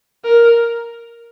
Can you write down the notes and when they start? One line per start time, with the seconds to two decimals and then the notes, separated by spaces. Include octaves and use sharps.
0.24 A#4